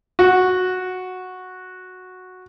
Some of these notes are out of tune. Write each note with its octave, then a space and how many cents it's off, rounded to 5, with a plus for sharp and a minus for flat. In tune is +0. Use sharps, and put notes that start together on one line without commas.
F#4 -10